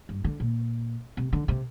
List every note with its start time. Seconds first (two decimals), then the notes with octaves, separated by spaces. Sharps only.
0.09 G2
0.24 D3
0.40 A#2
1.17 C3
1.33 D3
1.48 C3